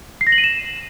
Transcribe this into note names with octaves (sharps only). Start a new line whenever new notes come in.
C7
A#6
F#7
D#7
E7